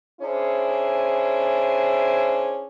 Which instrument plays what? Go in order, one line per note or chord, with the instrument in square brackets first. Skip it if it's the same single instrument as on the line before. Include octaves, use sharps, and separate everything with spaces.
[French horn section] C#4 D4 E4 G#4 C5